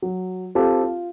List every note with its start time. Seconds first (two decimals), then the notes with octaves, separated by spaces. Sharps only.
0.02 F#3
0.55 C4 F4 G4 A4
0.83 F4